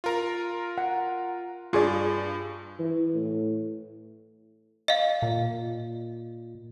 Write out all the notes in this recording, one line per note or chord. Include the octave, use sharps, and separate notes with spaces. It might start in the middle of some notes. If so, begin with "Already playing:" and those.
F4 A#4 A#5
F#5
G2 F4 G#4 D5
E3
A2
D#5 F5
A#2